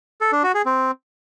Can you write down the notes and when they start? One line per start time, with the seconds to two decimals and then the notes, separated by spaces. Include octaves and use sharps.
0.21 A4
0.32 D4
0.43 F#4
0.55 G#4
0.66 C4